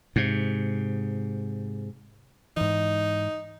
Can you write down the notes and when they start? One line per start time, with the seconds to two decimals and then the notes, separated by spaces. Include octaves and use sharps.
0.16 G#2 C3
2.57 G#2 E3 D#4